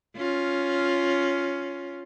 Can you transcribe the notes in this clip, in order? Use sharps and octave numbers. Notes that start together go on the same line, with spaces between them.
C#4 F4